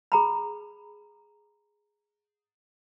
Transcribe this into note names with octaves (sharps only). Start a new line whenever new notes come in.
G#4 A#5 B5